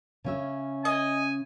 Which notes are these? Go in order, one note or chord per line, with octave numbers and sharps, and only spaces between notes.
C#3 C#4 E5
D#5 G#5